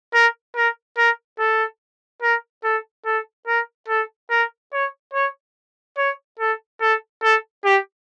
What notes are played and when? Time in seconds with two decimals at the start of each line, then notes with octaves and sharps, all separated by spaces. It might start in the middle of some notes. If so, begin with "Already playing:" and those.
0.14 A#4
0.55 A#4
0.97 A#4
1.39 A4
2.22 A#4
2.64 A4
3.06 A4
3.47 A#4
3.89 A4
4.30 A#4
4.73 C#5
5.14 C#5
5.98 C#5
6.40 A4
6.81 A4
7.23 A4
7.65 G4